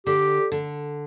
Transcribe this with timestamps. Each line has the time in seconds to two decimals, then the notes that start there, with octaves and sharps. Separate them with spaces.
0.07 D3 G4
0.52 D3